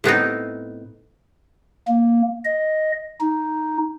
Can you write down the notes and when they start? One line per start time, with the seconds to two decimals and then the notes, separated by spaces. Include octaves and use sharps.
0.04 A2 B3 C4 D#4
1.88 A#3
2.45 D#5
3.21 D#4